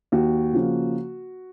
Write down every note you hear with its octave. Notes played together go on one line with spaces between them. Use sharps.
D#2 F#4
C#3 F3 A#3